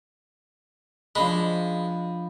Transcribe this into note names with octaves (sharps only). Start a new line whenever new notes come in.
F3 G#3 D4 B5